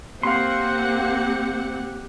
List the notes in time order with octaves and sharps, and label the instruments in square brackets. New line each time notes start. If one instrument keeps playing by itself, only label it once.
[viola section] A#3 C4 F#5 [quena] G4 [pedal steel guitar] F5 C6